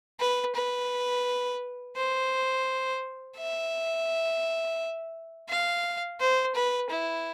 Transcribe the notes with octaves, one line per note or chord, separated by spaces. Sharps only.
B4
B4
C5
E5
F5
C5
B4
E4